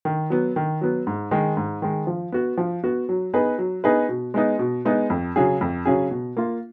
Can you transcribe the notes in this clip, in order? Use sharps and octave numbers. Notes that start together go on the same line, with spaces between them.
D#3
F#3 B3
D#3
F#3 B3
G#2
D#3 G#3
G#2
D#3 G#3
F3
B3 F#4
F3
B3 F#4
F#3
B3 D#4 G#4 B4
F#3
B3 D#4 G#4 B4
B2
G#3 B3 D#4
B2
G#3 B3 D#4
F2
C#3 F#3 C#4 G#4
F2
C#3 F#3 C#4 G#4
B2
A#3 F4